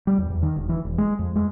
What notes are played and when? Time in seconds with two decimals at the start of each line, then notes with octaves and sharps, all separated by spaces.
0.07 G3
0.18 E2
0.30 E2
0.43 D#3
0.57 E1
0.69 E3
0.85 E1
0.98 G#3
1.19 F2
1.36 G#3